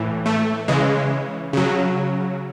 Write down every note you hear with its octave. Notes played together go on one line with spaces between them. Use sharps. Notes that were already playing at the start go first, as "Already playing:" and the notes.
Already playing: A2 E3
A3
C#3 E3 G#3
C#3 F#3